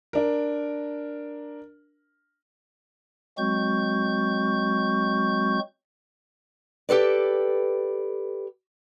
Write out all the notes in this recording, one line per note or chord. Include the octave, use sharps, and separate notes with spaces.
D4 A#4
F#3 G#3 C4 F#4 C#6 G6
G4 A4 B4 D5